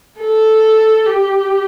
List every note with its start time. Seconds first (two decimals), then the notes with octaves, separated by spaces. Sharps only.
0.20 A4
1.06 G4